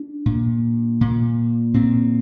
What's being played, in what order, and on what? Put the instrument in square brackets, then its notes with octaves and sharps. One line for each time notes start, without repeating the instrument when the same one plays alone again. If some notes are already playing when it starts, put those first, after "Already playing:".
Already playing: [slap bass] D4
A#2
A#2
A#2 C4